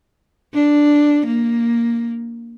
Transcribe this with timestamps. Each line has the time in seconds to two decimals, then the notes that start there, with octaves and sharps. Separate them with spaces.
0.54 D4
1.26 A#3